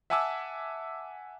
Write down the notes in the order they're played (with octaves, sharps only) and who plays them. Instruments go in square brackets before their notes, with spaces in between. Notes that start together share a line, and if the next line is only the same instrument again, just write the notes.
[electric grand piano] E5 F#5 G#5 A5 D6 E6